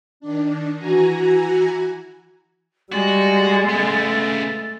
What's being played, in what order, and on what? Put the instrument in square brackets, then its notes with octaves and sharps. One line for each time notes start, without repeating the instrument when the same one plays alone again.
[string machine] D#3 D4
E3 F#4 G#5 A#5
[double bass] G3 [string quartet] G#3 [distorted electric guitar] F#4 [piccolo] A6
[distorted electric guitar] C#3 B3 [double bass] A3